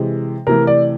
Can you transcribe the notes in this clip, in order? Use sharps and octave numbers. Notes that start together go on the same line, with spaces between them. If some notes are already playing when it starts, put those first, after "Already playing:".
Already playing: C3 E3 G#3
C3 E3 A3 A#4
D5